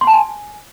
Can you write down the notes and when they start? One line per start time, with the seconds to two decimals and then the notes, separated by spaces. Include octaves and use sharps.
0.01 C6
0.07 A5
0.13 G#5